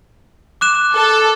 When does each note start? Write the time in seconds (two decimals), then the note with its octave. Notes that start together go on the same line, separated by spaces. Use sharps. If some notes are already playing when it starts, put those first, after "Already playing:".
0.61 D6 F#6 E7
0.94 A4